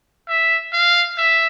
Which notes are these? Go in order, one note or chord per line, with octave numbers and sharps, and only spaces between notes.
E5
F5
E5